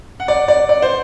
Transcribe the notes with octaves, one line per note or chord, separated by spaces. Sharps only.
F#5
D5
D5
D5
C5